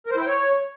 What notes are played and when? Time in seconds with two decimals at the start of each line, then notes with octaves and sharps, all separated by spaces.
0.06 A#4
0.12 C5
0.17 E4
0.22 G5
0.27 C#5